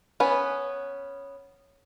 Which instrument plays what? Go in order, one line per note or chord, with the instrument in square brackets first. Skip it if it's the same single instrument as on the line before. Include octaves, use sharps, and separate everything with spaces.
[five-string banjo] B3 C#4 B4